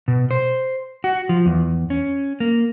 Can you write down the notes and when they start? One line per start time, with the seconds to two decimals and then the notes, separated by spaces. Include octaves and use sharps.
0.08 B2
0.31 C5
1.04 F#4
1.29 F3
1.46 E2
1.90 C#4
2.40 A#3